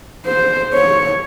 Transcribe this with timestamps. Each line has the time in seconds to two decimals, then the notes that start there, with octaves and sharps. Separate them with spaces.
0.26 C5
0.74 C#5